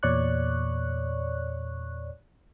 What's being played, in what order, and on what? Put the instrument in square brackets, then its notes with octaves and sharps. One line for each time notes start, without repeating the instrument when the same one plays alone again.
[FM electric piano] E2 A#2 C#5 D5 C#6 F#6